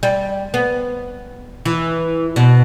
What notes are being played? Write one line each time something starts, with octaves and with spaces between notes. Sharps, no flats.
G3
B3
E3
B2